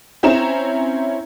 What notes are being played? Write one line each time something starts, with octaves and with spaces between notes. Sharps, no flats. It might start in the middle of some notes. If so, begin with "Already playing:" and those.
C4 C#4 E4 A#5 E7